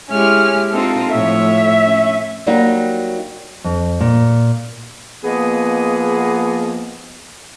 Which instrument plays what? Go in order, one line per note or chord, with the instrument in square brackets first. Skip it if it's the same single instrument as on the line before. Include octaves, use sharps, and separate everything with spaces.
[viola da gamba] G#3 E4 G4 [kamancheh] C#4 F6
[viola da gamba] C4 D#4 F4 [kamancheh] A4
[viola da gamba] A2 F3 C#5 [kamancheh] E5
[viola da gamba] C#4
[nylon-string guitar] F#3 G3 A#3 D#4 F#4
F2
A#2
[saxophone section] F3 A#3 B3 G#4 D#5